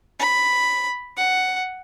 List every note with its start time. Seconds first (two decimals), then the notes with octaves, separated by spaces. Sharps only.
0.19 B5
1.17 F#5